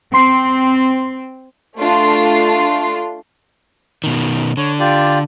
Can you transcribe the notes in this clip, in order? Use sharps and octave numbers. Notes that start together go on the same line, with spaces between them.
C4 C6 C7
A3 D4 F4 C6
B2 D#3
D3 C#5
F4 G4 D5